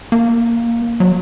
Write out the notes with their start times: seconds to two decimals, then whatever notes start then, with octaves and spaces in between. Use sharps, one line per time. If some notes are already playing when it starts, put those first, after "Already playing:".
0.12 A#3
1.00 F#3